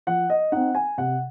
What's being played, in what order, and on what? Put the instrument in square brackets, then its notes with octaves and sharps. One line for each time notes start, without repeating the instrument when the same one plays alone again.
[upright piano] F3 F#5
D#5
C4 D#4 F#5
G#5
C3 F#5